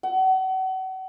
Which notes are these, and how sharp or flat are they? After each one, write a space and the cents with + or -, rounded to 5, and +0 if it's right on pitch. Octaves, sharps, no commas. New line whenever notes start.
F#5 +35